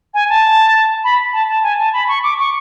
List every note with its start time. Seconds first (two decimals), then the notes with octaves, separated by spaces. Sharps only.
0.14 G#5
0.29 A5
1.04 B5
1.33 A5
1.48 A5
1.63 G#5
1.79 A5
1.93 B5
2.08 C#6
2.23 D6
2.39 C#6